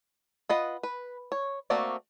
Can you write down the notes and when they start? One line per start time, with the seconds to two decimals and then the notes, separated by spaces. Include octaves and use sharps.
0.49 F4 B4 D#5 F#5
0.83 B4
1.32 C#5
1.70 A3 A#3 C4 F#4 D5